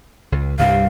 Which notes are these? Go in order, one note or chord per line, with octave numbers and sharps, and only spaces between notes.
C#2
C2 G2 G3 F5